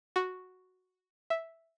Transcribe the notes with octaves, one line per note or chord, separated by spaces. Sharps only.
F#4
E5